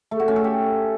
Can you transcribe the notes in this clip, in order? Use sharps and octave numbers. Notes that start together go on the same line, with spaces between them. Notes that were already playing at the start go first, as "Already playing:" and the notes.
A3
F#4
C#4
A4
G4